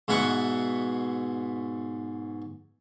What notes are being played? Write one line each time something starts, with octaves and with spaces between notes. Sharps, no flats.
G#2 B2 E4 F#5 C#6